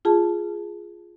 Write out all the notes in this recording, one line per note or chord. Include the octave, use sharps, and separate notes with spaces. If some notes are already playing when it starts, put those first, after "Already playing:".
F4 G#4 A5